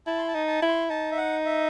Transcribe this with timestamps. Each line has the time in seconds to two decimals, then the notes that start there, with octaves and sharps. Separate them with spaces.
0.06 E4 A5
0.18 C6
0.28 A5
0.34 D#4
0.48 A5
0.62 E4
0.69 C6
0.90 D#4 A5
1.11 E5
1.17 F#5
1.45 E5